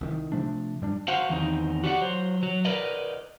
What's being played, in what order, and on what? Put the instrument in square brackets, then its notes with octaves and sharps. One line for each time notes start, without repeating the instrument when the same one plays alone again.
[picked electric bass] C2 D#3
C3 F3 A3 D4
G2 G3 D4
[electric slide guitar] F#4 C5 F5 F#5
E2 D#3 C4 D#4
F#4 G4 D5 E5 F#5
F#3 C5
F#3
A#4 B4 D5 D#5